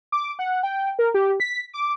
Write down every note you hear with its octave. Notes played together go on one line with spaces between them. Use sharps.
D6
F#5
G5
A#4
G4
B6
D6